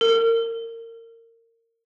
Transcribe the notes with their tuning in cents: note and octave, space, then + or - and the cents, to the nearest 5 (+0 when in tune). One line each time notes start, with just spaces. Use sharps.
A#4 -25